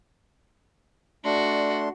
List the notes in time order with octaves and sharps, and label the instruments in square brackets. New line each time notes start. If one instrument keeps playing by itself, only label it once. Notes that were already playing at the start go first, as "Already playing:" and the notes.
[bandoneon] A3 D4 C6 [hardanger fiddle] F#4 [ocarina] D5